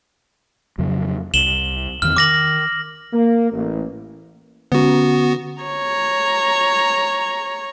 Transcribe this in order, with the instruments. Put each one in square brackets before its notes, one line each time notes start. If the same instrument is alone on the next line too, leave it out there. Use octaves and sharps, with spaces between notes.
[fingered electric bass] F2 C#3 F#3
[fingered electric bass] C2 [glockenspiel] E7 F#7 G7
[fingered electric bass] E2 D#3 C4 [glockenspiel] F6
[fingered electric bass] D#3 [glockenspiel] D6 A#6 F#7
[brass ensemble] A#3
A1
[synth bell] D3 C#4 [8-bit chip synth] B3 F#4
[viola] C#5 A#5